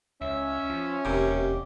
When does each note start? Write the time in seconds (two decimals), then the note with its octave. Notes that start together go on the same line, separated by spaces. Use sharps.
0.21 C#2 C#4 E5
0.70 F3
1.05 E1 D#2 C3 G4